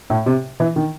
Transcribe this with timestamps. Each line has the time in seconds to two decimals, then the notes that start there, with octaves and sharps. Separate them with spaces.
0.10 A2
0.26 C3
0.60 E3
0.76 D#3